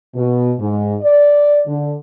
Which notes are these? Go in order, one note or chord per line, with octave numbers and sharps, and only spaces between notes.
B2
G#2
D5
D3